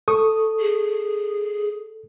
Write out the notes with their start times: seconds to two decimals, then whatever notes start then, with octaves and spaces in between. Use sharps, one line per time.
0.08 A4 C#6 D#6
0.60 G#4